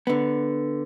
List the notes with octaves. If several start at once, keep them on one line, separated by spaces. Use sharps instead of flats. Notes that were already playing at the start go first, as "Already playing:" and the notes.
D3 B3